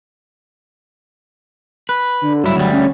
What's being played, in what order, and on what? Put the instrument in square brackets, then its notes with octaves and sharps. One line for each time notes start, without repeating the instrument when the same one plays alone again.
[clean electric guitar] B4
[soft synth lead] D3
[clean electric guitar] G2 E4 [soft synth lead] F#3
[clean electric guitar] D2 G3
[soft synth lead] C#4